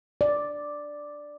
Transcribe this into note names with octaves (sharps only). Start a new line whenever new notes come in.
D5